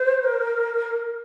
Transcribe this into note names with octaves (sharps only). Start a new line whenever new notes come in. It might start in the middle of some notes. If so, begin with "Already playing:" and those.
Already playing: C5
A#4